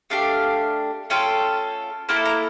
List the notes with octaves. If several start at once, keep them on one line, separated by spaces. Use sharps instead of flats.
A3 D4 G4 F5
A3 C#4 F4 A4 G5
A#3 E4 A4 A5
A#5